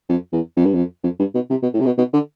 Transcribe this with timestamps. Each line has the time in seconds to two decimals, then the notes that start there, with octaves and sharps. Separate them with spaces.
0.09 F2
0.33 E2
0.56 F2
0.65 G2
0.74 F2
1.03 F2
1.19 G2
1.35 B2
1.50 C3
1.62 B2
1.74 A2
1.80 C3
1.86 B2
1.98 B2
2.13 D3